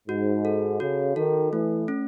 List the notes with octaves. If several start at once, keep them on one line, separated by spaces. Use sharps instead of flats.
G#2 F#4
A4
C#3 F#4
D#3 A4
E3 A3
C#4